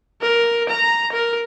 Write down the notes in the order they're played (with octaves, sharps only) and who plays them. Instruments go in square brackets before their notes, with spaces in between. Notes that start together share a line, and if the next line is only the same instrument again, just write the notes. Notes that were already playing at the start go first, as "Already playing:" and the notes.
[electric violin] A#4
A#5
A#4